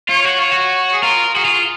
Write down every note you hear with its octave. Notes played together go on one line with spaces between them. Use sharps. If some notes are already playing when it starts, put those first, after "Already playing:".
F4 C#5
F#4
F4 C#5
F#4
G#4
F4 A#4
F#4 G#4
F4